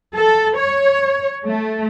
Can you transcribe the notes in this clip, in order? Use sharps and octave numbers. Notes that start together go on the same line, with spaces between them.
A4
C#5
A3